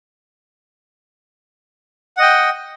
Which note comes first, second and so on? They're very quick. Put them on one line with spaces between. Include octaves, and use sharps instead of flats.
F#5 D#5 G5